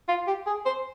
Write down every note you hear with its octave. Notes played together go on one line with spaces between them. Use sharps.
F4
G4
G#4
C5